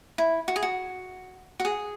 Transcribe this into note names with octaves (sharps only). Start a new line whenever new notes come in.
E4
F#4
G#4
F#4
F#4
G#4